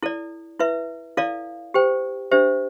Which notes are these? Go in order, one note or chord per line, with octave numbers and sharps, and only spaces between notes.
E4 A4 D5
E4 B4 E5
E4 A4 D5 F5
G4 C5 G5
D4 G4 C5 E5